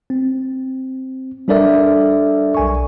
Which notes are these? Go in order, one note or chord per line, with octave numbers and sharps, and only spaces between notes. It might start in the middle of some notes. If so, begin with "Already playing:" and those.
C4
G3 D4 A4 A#4 D5 E5
B1 G#5 C#6